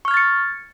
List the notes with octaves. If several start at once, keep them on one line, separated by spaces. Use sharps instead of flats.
C#6 F6 G#6 A6 C#7